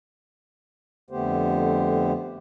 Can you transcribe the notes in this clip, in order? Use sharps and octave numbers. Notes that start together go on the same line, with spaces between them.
F2 D3 A3 B3 G4 C5